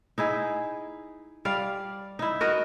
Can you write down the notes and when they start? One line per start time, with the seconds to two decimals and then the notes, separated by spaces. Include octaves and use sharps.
0.18 D#4 E4 G#4
1.45 G3 D5 F5
2.19 D#4 E4
2.41 F#4 A#4 D#5